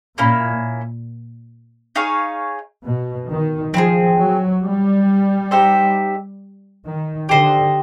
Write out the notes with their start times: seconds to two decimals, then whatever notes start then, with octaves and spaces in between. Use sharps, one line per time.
0.18 A#2 A#3 C#4 E4
1.96 D#4 G#4 C#5 F5
2.85 B2
3.29 D#3
3.74 F3 C4 E4 G#4
4.18 F#3
4.63 G3
5.51 D#4 G4 C5 E5
6.85 D#3
7.29 D3 G4 C5 D#5